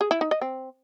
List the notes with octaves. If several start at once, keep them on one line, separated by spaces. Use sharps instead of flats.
G#4
E4
D#4
D#5
C4